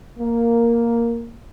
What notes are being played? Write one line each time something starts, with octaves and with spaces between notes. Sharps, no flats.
A#3